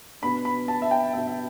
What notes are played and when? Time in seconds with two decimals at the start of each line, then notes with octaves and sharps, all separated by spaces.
0.22 B2 B3 D4 B5
0.45 B5
0.68 A5
0.82 E5
0.91 G5
1.13 B2 B3 D4 E5
1.27 E5